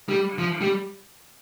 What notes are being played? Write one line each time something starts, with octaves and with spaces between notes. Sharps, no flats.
G3
F3
G3